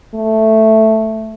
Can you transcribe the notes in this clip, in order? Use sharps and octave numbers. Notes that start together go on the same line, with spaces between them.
A3